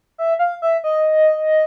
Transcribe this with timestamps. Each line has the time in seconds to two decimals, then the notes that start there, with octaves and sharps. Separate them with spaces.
0.18 E5
0.39 F5
0.62 E5
0.84 D#5